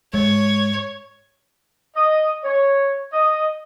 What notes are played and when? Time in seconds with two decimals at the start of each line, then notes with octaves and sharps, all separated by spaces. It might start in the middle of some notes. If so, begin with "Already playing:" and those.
0.14 G#2 G#3 C#5
1.96 D#5
2.44 C#5
3.13 D#5